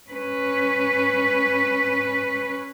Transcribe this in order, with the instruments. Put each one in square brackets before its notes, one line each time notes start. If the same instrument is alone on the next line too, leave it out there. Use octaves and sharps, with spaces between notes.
[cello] C#4 B4